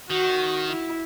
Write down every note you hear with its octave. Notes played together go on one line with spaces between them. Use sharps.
D#3 F#4
E4